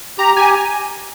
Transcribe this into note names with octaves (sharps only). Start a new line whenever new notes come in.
G4 A#5
G4 G#5